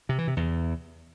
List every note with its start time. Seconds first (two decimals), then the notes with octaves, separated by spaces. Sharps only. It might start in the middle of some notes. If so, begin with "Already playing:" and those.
0.09 C3
0.18 E3
0.28 C3
0.37 E2